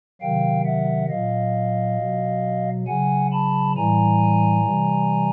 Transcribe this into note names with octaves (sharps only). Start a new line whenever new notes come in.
C3 D#3 F#3 F5 G5
E5 F#5
A#2 F#3 D#5 F5
B2 F#3
C#3 F#3 F#5 G#5
A5 B5
A2 E3 G3 G#5 A#5
C3 E3 G3